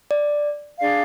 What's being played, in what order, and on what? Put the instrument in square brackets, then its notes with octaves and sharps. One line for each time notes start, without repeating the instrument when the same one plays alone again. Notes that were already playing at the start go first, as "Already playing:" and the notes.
[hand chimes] D5
[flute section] D4 G#4 D5 F5